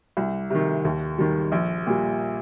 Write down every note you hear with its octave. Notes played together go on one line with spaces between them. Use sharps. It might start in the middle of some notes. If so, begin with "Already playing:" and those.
C2
C3 D#3
D#2
D#3 G3
A#1
A#2 G3